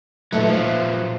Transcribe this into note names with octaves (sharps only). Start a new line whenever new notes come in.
A#2 E3 F#3 A3 D#4
A#2 F3 F#3